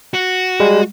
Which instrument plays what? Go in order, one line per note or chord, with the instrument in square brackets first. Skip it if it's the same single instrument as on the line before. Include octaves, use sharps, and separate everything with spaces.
[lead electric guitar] F#4
[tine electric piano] G3 G#3